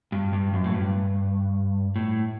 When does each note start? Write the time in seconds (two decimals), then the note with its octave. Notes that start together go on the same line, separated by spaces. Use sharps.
0.12 G2
0.33 G2
0.53 F#2
0.64 A2
0.74 G2
1.96 A2